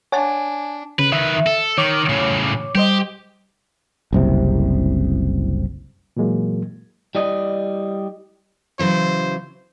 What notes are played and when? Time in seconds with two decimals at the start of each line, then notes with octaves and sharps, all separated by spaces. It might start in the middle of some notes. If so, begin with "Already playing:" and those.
0.12 D4 C#5 F#5 G#5 A5
0.99 C#3 B4
1.12 D#3 B4 E5
1.46 A4
1.78 D#3 C#5 D6
2.09 A2 C#3
2.75 G3 G4 C5 D#5
4.13 F#1 C2 C3
6.17 A#2 E3 F#3 G#3 A#3
7.15 G3 E4 D5 D#5
8.79 C#3 E3 F#3 C5